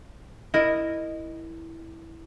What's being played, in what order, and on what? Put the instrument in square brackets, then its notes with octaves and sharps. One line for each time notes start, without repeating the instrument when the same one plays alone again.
[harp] E4 A#4 D#5